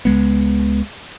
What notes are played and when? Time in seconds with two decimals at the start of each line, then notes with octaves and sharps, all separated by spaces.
0.05 C#2 G#3 B3